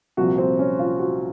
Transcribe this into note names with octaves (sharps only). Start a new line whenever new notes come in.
C2 A#2 F3 F#4
C4
C#4
F4
F#4